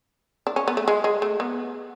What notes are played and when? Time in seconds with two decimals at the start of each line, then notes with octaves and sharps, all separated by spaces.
0.47 D4
0.56 C#4
0.68 B3
0.77 A3
0.88 G#3
1.04 G#3
1.22 A3
1.40 B3